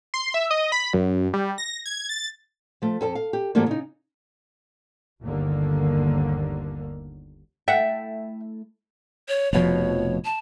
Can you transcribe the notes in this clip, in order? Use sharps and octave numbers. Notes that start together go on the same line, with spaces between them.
C6
E5
D#5
B5
F#2
G3
A#6
G#6
A6
F3 A3
F2 A4 A5
F5
G4
G#2 E3 F#3 G3 A3 A#3
C#3 D#4
G1 D#2 D3 A#3
A3 E4 E5 F#5 G5
C#5
F1 B2 F3 C#5
A5